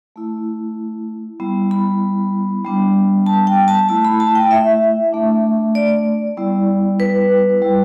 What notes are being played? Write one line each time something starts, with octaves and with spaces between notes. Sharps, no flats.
A3 E4
G3 B3 E4
B5
G3 B3 D4
A5
G5
A5
A3 E4 A5
B5
A5
G5
E5
A3 D4
D5
G3 B3 E4
B4
G3 E4